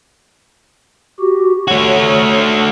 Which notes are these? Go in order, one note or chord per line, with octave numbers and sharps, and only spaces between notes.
F#4 G4
A3 F#4 C#5